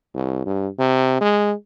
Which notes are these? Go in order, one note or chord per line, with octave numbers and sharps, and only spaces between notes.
C2
G2
C3
G#3